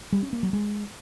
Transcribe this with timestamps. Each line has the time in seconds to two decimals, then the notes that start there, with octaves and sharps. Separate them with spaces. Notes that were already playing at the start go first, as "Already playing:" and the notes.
0.12 G3
0.23 C#4
0.33 A#3
0.43 F#3
0.53 G#3